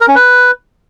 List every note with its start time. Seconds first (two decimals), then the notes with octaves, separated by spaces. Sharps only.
0.01 A#4
0.08 C#4
0.16 B4